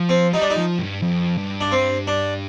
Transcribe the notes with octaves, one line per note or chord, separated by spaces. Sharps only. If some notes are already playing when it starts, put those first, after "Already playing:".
Already playing: F3
C4
G3 D#4
D4
D#4
F3
G2
F2
G2
D4
C4
D4